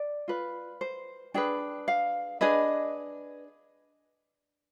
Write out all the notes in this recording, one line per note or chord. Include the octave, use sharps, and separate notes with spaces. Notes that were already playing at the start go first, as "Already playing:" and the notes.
Already playing: D5
F4 B4
C5
D4 G#4 B4 G5
F5
D4 G#4 B4 D#5